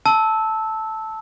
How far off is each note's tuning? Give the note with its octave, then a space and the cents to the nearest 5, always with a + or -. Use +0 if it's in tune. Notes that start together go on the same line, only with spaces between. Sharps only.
A5 +0 E6 -15